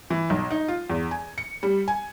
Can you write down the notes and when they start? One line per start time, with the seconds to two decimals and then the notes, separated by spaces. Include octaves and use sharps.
0.10 E3
0.30 B1
0.50 D#4
0.68 F4
0.90 E2
1.11 G#5
1.38 C#7
1.63 G3
1.88 G#5